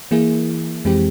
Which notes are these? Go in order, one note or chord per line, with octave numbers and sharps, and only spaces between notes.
E3 A#3 E4 G#4
F2 E3 G#3 C4 G4